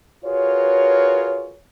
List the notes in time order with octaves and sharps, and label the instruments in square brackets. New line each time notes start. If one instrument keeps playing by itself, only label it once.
[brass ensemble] F4 F#4 G#4 A#4 B4 C#5